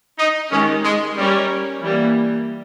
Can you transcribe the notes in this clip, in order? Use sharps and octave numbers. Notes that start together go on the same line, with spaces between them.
D#4
D#3 G#3 C#4 D#4 G4
G#3
G3 C#4 G4 A#4 C#5
E3 G3 A#3